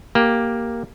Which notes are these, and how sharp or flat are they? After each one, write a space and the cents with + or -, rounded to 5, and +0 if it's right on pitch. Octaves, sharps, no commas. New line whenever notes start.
A#3 +0 G4 +0